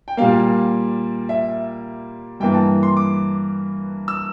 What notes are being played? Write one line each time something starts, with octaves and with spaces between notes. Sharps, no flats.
G5
A#2 G3 A#3 F5
E5
G2 E3 A#3 G5
A5
C6
D6
E6